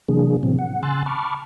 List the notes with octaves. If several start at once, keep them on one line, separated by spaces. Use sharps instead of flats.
C3 E3 F#3 A#3 D4 G#4
A2 C3 E3 F#3 C4
F#5
C#3 G#5 C6 E6 F#6 A6
A5 B5 C#6 D6 F6